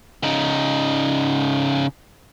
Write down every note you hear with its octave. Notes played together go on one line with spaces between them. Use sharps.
C#3 D#4